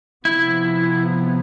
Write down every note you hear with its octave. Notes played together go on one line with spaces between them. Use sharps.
C3 F3 B3 E4